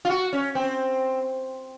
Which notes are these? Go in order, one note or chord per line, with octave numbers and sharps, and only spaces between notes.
F4
F#4
C#4
C4